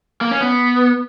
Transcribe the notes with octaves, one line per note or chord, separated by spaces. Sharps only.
A#3
C#4
B3